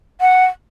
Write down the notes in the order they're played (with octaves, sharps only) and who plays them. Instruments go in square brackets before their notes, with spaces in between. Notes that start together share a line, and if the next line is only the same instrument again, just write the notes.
[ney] F#5